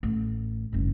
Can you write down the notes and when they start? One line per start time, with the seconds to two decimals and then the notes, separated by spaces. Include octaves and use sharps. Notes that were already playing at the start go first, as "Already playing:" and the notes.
0.03 A1
0.72 F#1 G2